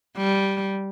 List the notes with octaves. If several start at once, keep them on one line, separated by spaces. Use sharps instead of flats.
G3